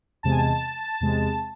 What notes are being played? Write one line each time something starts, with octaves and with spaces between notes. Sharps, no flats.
E2 C3 G#3 A5
G#5
A5
E2 C3 G#3